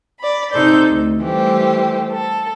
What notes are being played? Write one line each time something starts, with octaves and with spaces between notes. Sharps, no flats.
D5 B5
C3 D#4 A4 C5 D5 G6
D2
E3 G3 A3 G4 C5
A4